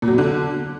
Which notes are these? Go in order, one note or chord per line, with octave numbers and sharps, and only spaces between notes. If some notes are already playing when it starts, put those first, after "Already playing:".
A#2
F#3
B2
D3